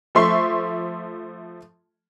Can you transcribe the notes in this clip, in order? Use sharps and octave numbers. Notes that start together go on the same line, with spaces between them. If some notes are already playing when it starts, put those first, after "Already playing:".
F3 A3 E5 C6 C#6 C7